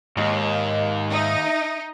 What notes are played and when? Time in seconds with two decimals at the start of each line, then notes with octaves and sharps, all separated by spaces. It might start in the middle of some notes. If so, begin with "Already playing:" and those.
0.17 D#2 G#2 D#5
1.12 D#4 E5